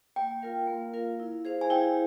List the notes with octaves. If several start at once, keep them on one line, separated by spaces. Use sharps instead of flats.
A#3 G5
F4 A#4 F5
A#3
F4 A#4 F5
E4
G#4 C5 F5
G#5
E4 G5